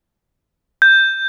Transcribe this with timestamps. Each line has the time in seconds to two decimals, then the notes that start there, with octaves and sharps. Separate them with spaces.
0.82 G6